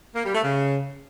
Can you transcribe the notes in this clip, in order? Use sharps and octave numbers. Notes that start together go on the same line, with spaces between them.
A#3
G3
A3
C#3